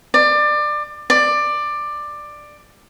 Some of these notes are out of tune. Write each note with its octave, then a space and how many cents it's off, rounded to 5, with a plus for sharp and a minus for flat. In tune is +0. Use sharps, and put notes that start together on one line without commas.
D5 +25
D5 +15